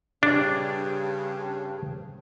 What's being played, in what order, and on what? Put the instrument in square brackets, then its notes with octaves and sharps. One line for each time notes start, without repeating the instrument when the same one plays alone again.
[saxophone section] G2 C#3 [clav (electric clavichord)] D4